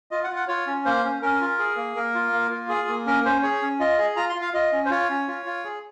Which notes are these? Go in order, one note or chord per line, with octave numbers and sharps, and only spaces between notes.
F4 D#5
F#5
F4
F#5
F4 C#5
C#4
A#3 C5
C#4
C#4 A#4
F4
G#4
A#3
A#3 A#4
F4
A#3
F4
G#4
A#3
C#4 A#4
C#4 C5
G#4 C#5
C#4
F4 D#5
G#4
F4 A#5
C6
F4
F5
F4 D#5
C#4
C5
F4 C#5
C#4
F4
F4
G#4